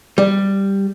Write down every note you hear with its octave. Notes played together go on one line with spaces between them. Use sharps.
G3